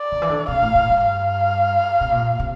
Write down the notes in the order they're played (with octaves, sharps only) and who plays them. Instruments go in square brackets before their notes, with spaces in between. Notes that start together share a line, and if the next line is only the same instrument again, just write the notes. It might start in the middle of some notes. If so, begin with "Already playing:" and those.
Already playing: [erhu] D5
[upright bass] D3
E3
D3
[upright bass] C3 [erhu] F5
[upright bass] A2
A2
G2
[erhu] F5
[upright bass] C3
A#2
C3